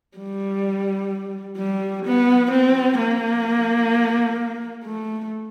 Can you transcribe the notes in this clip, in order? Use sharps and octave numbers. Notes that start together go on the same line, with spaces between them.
G3
G3
B3
C4
A#3
A3